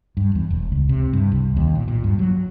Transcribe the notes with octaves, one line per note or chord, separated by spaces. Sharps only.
G2
E2
E1
C#2
C3
G2
C2
D#2
A#2
A#2
G2
F#3